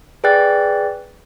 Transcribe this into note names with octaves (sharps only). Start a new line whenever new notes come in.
G#4 B4 D5 G5 F#6 A6